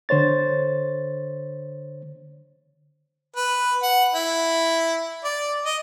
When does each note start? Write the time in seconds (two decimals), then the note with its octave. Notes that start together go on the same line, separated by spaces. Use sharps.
0.09 D3 C5 C#5 A6
3.36 B4
3.83 F#5
4.15 E4
5.24 D5
5.66 D#5